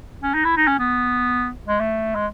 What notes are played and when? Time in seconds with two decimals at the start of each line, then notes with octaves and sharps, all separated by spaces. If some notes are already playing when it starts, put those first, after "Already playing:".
0.23 C#4
0.34 D#4
0.45 E4
0.57 D#4
0.67 C#4
0.79 B3
1.68 G#3
1.80 A3
2.15 G#3